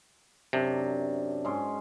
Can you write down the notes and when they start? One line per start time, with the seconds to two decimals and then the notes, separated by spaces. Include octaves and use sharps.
0.53 F#2 C3 D4
1.45 G#2 C#4 C6